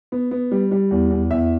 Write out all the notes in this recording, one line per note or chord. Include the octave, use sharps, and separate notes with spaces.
B3
B3
G3
G3
E2
E2
E2 E5